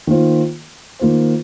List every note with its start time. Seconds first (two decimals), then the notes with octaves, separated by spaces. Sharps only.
0.07 D#3 A#3 F4 C5
0.99 D#3 A#3 F4 C5